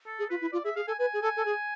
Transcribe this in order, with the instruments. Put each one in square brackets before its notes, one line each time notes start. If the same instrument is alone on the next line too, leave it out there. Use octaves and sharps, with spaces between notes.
[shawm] A4
[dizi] G#4
[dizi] F4 [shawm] B4
[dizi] E4
[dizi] F4 [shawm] D5
[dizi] G#4 [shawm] E5
[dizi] G#4 [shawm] F5
[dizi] A4 [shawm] G#5
[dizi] B4 [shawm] G#5
[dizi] G#4
[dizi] A4 [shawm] G#5
[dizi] A4
G#4